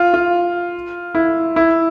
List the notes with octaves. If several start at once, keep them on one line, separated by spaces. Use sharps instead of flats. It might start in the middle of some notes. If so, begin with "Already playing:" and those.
Already playing: F4
F4
E4
E4